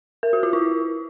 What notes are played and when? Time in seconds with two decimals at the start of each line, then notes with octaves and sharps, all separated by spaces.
0.23 A#4
0.33 F#4
0.43 F4
0.53 E4